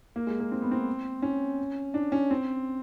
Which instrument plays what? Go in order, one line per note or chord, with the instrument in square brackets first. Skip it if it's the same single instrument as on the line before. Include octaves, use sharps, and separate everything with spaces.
[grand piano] A#3
G#3
A#3
C4
B3
C4
C#4
D4
C#4
C4